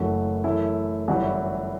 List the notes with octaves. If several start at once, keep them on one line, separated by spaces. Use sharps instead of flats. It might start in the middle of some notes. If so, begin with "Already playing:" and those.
Already playing: F#1 F#2 E3 A3 F#4
F#2 E3 A3 E4
G1 F#2 E3 G3 F#4
E4